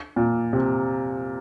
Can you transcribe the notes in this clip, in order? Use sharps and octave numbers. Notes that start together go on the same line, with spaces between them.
A#2
C3